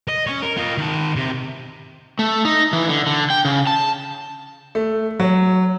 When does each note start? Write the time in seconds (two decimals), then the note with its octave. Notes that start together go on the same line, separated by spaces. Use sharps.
0.08 D#5
0.27 C#4 C#5
0.42 A#4
0.57 F4 D#5
0.78 D#3 A5
1.16 C3
2.19 A3
2.45 D#4
2.73 E3
2.88 D3
3.07 D3
3.30 G5
3.45 C#3
3.67 A5
4.75 A3
5.20 F#3